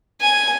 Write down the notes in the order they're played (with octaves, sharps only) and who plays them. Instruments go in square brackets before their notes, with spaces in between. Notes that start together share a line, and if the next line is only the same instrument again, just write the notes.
[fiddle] G#5